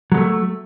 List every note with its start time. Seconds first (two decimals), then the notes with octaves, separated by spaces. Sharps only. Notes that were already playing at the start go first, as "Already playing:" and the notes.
0.12 F#3
0.14 G#3
0.17 A3